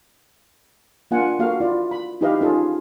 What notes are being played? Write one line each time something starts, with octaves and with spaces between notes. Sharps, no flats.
A#3 D4 F4 F#5 G#5
A#3 F#4 A4 F5
E4 F4 D5
B5
D#4 E4 G4 B4 D#5 F5
C#4 D#4 F4 G#4 A4